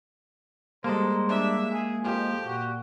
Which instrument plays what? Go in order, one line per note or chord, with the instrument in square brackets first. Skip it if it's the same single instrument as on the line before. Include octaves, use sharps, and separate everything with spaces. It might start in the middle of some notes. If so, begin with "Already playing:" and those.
[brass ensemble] G3 A#5 [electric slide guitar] G#3 A#3 [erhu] A4 [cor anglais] C5
[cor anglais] D4 [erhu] E5
[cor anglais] G#4
[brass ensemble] F2 D#3 [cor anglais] F3 [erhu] G4
[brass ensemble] A#2 [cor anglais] F#4